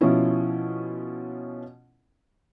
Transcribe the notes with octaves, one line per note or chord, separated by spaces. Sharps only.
B2 F3 C#4 E4